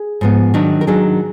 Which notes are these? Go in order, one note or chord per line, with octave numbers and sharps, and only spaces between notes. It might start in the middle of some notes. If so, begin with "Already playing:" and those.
Already playing: G#4
G#2 F3 B3
D#3 F#3 D4
A#4
D#3 F#3 D4 G#4